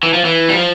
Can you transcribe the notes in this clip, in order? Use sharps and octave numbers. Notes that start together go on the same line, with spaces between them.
E3
F3
E3
G3
F3